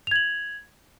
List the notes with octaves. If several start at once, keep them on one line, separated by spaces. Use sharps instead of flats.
G#6 F7 F#7